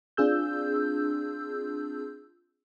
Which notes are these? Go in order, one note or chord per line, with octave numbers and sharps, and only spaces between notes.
C4 D4 F4 G#4 E6 G6